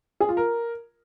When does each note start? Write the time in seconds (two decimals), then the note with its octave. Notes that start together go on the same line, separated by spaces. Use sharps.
0.20 G#4
0.29 F4
0.37 A#4